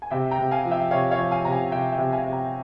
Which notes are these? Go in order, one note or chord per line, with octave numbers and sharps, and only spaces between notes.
G#5
C3 E5 G5
G5 A#5
C3
F5 G#5
F3
E5 G5
C3 C#5 F5
C#5 F5
F3
F5 G#5
C3 A#5
F5 G#5
C3 E5 G5
E5 G5
C3
F5 G#5
C3
G5 A#5